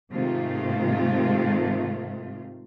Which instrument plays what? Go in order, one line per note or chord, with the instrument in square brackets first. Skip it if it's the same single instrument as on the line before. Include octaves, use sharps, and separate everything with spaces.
[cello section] G#2 C3 D#3 A3 F4